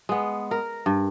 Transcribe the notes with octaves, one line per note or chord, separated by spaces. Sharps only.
G#3 B3
A#4
G2